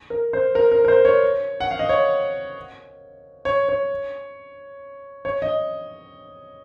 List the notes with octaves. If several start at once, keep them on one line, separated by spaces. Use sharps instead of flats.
A#4
C5
A#4
A#4
A#4
C5
C#5
F#5
F5
D#5
C#5
C#5
C#5
C#5
D#5